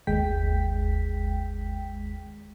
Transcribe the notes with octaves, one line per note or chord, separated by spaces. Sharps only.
G1 D#2 G#3 G5 B6